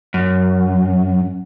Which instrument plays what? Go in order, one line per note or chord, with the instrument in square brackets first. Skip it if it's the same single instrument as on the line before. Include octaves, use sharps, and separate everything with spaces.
[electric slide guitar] F#2